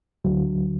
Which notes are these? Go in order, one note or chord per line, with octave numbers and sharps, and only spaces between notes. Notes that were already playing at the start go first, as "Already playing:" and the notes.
D2 D3 F#3